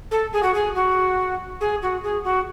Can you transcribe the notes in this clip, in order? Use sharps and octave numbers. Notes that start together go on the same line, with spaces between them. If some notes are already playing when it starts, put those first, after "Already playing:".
A4
G#4
F#4
G#4
F#4
G#4
F#4
G#4
F#4